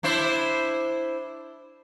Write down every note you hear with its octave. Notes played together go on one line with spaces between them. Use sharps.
D4 E4 C5